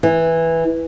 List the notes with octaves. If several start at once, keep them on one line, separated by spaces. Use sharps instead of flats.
E3